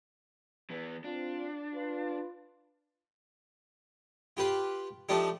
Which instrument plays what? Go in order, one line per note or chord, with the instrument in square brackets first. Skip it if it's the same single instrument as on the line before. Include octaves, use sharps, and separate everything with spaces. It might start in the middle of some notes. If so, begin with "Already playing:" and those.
[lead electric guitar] E3 B3
[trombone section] C4 F4 [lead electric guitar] D4
[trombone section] F4 B4
[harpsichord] F4 G4 B4 F5
F3 A3 D4 D#4 F4 G4